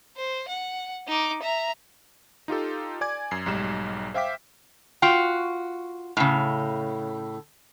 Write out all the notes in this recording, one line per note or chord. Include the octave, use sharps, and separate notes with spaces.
C5
F#5
D#4 D6
E5 A#5
D#4 F4 G4 A4
D5 G#5 D6 G#6
F#2 C7
B1 G#2 G3 E7
C5 E5 F5 G5 D6 B6
F4 F#4 G5
A2 C#3